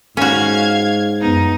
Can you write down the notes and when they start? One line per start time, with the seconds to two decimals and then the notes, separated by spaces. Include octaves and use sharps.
0.17 G#2 C#4 F#4 F5 G#6
1.21 F#2 B3 D#4